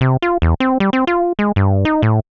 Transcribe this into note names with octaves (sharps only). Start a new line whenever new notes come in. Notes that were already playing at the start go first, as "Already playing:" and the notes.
C3
F4
E2
C4
G3
C4
F4
G#3
G2
D#4
A2